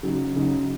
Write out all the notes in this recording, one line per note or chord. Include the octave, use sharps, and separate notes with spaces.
C#3 F#3 D#4
C#3 F#3 D#4